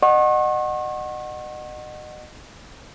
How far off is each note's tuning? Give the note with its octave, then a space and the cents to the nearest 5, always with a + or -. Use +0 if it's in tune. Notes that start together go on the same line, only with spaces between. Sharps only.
D#5 -30 F#5 +0 C#6 -40